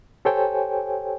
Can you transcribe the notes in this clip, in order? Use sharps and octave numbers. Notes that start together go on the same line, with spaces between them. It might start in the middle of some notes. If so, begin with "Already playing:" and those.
G4 A4 C5 C#5 G5 G#5